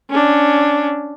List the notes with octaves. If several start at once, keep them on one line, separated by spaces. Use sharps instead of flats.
C#4 D4